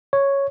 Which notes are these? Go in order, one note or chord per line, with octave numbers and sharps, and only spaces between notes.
C#5